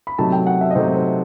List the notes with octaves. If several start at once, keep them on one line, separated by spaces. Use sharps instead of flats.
B5
C3 F#3 A3 D#4 A5
G5
F#5
E5
D#5
C3 F#3 A3 D#4 C5
C5